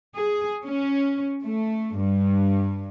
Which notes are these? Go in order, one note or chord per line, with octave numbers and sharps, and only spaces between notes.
G#4
C#4
A3
G2